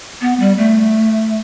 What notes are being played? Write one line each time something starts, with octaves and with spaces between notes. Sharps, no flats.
B3
G3
A3